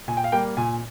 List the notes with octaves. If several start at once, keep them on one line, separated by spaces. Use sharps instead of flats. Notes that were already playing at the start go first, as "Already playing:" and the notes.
A#2 G#5
G5
F5
G3 A#3 G5
A#2 G#5